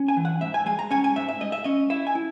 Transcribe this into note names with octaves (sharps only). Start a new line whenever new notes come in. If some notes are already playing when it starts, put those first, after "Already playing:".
Already playing: C#4
G#5
E3
F#5
G#2 E5
G#5
G#3 G#5
A#5
C#4 G#5
G#5
G#2 E5
E5
G#2 D#5
E5
C#4 D#5
E4 E5
G#5
E4